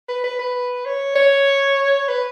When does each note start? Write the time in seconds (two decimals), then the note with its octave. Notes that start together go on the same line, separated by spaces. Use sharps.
0.09 B4
0.24 B4
0.39 B4
0.86 C#5
1.16 C#5
2.08 B4